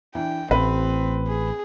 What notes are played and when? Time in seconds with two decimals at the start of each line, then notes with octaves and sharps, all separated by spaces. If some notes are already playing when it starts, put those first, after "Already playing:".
0.15 E3 D4 G5
0.51 A1 C4 B4
1.27 G#4